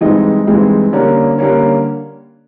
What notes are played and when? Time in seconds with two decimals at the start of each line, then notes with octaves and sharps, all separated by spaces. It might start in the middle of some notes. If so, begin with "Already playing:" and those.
0.01 G2 E3 G#3 C4 D#4
0.46 G2 E3 G#3 C4 D#4
0.93 D3 G3 A#3 C#4
1.38 D3 G3 A#3 C#4